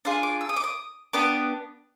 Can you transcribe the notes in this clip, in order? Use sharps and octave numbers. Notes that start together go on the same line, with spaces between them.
D4 F4 G#4 C6
D6
E6
D#6
D6
D#6
B3 D4 G4 D6